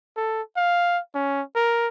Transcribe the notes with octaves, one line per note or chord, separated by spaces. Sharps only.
A4
F5
C#4
A#4